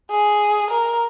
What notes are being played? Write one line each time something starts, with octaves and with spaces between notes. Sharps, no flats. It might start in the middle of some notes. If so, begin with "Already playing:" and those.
G#4
A#4